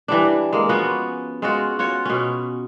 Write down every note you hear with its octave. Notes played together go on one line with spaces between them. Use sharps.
E3 G3 D4
G#3 A#3
F3 B3 C#4 F#4
G#3 F4 F#4
F4 F#4 C#5
B2 C#4